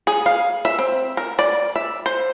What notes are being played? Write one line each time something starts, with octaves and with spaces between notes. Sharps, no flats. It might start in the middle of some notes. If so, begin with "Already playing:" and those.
G#4
F5
E5
C4
A#4
D5
E5
C5